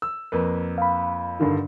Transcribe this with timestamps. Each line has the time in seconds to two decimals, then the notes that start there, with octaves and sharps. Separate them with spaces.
0.02 E6
0.32 F2 A#3 B4
0.78 F5 B5
1.40 G2 D3 D#3